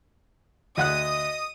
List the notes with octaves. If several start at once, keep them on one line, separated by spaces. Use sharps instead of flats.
D2 D#5 F#5 D#6 F#6